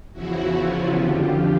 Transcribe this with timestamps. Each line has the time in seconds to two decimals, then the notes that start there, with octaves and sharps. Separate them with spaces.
0.13 E2 C#3 F3 E4 F#4
0.55 F4
0.95 F2 D3 F3 F4 G4